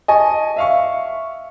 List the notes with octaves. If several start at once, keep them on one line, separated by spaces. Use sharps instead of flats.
D#5 G#5 A5 C#6
E5 F5 C#6